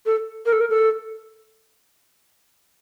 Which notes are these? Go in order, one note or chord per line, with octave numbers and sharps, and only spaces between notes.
A4
A#4
A4
A#4
A4